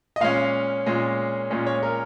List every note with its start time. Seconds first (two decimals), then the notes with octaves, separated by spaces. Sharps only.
0.16 D#5
0.21 A#2 G#3 C#4 F5
0.86 A#2 G#3 C#4
1.50 A#2 G#3 C#4
1.67 C#5
1.83 A#4